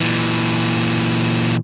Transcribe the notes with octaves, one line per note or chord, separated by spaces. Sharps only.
A#2 E3